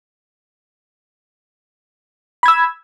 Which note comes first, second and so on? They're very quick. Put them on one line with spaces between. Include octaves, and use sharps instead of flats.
B5 G#6 E6